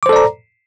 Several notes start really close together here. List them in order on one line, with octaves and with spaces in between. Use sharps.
D6 C5 A4 D5 A#5